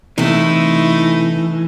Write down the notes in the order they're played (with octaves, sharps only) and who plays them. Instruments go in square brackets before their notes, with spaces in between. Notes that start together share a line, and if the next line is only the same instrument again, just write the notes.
[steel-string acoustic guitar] C3 E4 [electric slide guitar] E3 [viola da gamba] A3 D#4